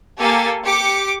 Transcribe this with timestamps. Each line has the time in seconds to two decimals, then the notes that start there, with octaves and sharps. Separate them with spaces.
0.18 A#3 G4 A4 G#5 A6
0.64 G4 D6 C#7 D7